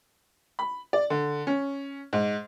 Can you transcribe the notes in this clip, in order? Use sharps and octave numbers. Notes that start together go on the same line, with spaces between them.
B5
D5
D3
C#4
G#2